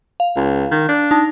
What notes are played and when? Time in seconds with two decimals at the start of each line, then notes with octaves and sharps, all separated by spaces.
0.20 F5
0.36 C#2
0.71 D#3
0.89 D4
1.11 D#4 A5